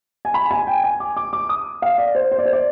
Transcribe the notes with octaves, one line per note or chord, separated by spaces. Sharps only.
G#5
B5
G#5
G5
G#5
D6
D6
D6
D#6
F5
D5
C5
C5
D5
C5
D5